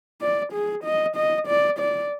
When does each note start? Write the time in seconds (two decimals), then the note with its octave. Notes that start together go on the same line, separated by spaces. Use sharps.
0.21 D5
0.53 G#4
0.84 D#5
1.16 D#5
1.48 D5
1.79 D5